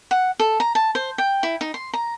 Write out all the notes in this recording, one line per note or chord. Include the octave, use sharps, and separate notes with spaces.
F#5
A4
A#5
A5
C5
G5
E4
D#4
C6
A#5